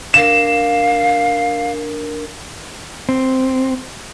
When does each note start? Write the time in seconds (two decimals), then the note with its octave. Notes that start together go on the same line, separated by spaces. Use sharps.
0.14 D4 A#4 F5 E7
3.09 C4